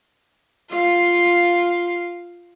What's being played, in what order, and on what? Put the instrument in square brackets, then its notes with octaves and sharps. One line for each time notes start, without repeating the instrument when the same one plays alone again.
[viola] F4 F5